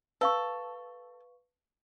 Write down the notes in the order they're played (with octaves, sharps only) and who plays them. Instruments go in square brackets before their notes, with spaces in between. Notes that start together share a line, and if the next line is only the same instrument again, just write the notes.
[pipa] A4 [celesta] B4 F5 C#6